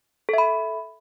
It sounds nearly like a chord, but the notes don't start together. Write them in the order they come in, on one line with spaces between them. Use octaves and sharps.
A4 E5 B5